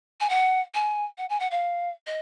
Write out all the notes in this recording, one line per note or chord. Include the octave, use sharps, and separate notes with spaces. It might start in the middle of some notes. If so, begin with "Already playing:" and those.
G#5
F#5
G#5
F#5
G#5
F#5
F5
D#5